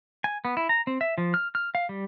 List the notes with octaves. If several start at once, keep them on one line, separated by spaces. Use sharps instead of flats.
G#5
B3
E4
A#5
C4
E5
F3
F6
F6
F5
G3